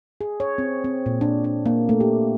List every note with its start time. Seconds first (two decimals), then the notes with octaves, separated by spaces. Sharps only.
0.21 G#4
0.40 C#5
0.58 C4
0.84 C4
1.06 A#2
1.21 D4
1.44 D4
1.66 A#3
1.89 A3
2.00 G4